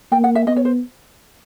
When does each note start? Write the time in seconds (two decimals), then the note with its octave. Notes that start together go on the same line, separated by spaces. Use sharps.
0.11 A#3 G5
0.24 F#5
0.35 E5
0.47 B3 D#5
0.56 C#5
0.65 C5